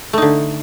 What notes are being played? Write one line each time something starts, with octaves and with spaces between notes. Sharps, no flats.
D3 A3 D#4